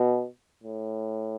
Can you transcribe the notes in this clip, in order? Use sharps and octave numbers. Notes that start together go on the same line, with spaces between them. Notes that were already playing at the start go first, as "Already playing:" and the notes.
Already playing: B2
A2